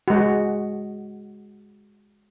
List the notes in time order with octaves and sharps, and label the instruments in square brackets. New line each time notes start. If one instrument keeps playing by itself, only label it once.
[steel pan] G#3 F#4